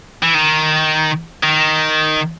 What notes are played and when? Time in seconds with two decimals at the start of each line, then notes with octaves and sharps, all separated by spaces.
0.23 E3
0.34 D#3
1.43 D#3